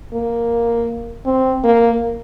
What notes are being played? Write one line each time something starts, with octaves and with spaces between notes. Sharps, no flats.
A#3
C4
A#3